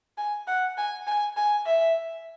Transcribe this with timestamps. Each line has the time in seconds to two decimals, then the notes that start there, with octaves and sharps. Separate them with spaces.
0.18 G#5
0.47 F#5
0.77 G#5
1.07 G#5
1.37 G#5
1.66 E5